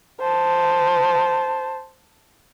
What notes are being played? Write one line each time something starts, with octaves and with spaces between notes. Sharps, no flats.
C5 A5